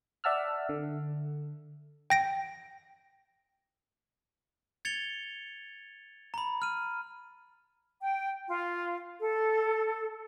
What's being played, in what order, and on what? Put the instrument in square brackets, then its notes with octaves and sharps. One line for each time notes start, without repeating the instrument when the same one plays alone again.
[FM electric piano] D5 E5 F#5 A5 E6 F6
D3
[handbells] G5 A#6 D7
[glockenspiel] G#6 A6 C#7 F7 G7
A#5 B5
F6 D#7
[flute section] G5
F4
A4